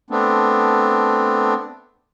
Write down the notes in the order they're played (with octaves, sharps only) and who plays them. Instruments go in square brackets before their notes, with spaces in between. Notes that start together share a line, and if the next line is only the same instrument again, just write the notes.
[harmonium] A3 B3 C4 D4